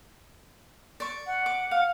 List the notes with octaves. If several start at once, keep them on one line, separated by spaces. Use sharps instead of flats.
D5 C#6
F#5
D6
F5